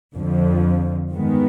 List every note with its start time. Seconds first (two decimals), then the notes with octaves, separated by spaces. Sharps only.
0.15 F2 D3 F3
1.12 G2 D#3 G#3 B3